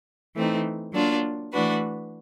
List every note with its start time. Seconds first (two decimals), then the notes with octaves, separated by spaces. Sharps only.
0.36 E3 A3 C4 D#4
0.93 F#3 A#3 D4 F4
1.52 E3 A3 D4 F#4 B4